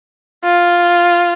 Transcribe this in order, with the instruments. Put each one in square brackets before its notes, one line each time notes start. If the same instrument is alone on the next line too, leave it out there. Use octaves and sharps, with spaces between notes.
[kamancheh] F4